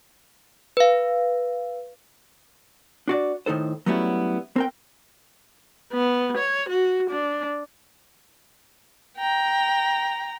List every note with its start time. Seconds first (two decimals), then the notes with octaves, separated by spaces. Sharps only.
0.77 B4 F5
3.08 D4 F#4 D5
3.46 A2 D#3 D#4 A4 C5
3.86 F#3 G3 A3 B3 C#4 E4
4.56 C4 A#4 G5
5.92 B3
6.38 C#5
6.69 F#4
7.10 D4
9.17 G5 A#5